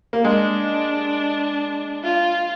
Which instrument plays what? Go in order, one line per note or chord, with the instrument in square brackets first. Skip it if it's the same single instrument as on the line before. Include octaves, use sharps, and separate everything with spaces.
[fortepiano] A#3
[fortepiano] G#3 [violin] D4
[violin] F4